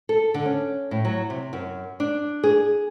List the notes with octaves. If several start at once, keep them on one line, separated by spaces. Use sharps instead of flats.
A4
D3
C#4
A2
F#3
C3
F#2
D4
G#4